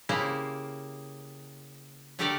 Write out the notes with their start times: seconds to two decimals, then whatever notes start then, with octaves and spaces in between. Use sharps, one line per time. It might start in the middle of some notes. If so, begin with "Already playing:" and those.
0.09 C#3 A#3 E4 G4 C5
2.19 D3 A3 G4 A4 A#4 D5